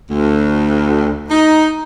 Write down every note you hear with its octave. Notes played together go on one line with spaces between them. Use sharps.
D2
D#4